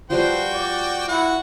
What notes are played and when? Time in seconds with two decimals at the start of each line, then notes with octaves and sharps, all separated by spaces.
0.10 F3 G3 F#4 B4 C5 G5
0.53 D5
1.08 E4 F#4 F#5